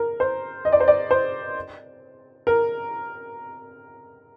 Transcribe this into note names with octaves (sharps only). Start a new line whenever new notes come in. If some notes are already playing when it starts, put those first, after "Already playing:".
Already playing: A#4
C5
D#5
D5
C5
D5
C5
A#4